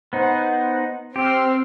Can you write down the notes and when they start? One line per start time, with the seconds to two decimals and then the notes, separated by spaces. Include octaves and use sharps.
0.13 B3 D#4 C5 F#5
1.16 C4 G4 C6 E6 F6